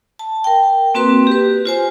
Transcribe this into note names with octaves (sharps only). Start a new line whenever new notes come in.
A5
A#4 G5
A#3 C4 F#4 B4 C6
G4 B4
F4 C5 G#5